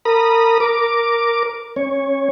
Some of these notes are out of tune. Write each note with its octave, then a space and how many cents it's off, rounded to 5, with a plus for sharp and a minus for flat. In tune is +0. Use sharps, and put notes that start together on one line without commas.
A#4 -35 B5 -30 D#6 -15
A#4 +0 D6 +0
C#4 -30 C#5 +0